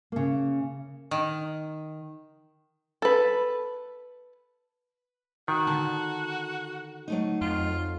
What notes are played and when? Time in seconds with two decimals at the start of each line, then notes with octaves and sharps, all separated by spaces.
0.12 C#3 A#3
1.11 D#3
3.02 A4 B4
5.48 D#3 F#4
5.67 D3 A5
7.08 F#3 A3 D#4
7.41 F2 F4